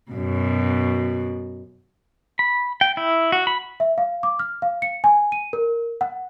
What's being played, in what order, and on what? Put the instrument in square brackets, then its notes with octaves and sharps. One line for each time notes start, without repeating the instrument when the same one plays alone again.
[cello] F#2 B2
[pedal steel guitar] B5
G5
E4
F#4
B5
[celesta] E5
F5
D6
F6
F5
C#7
G#5
D#7
A#4
F#5